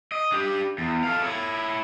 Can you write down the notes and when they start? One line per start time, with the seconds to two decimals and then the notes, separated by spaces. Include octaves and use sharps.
0.12 D#5
0.32 D4 G4
0.78 E2
1.04 A4 F5
1.24 E4 C#5